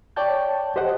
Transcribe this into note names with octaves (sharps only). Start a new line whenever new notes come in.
C#5 D5 G5 A5 G6
G4 C5 D#5 F#5